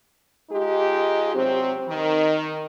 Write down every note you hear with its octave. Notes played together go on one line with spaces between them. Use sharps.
G#3 D#4 F4 G4
C3 F#3 C4
D#3